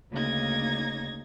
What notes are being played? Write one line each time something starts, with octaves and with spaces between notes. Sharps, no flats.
D2 C#3 A#3 D#4 G#6 A#6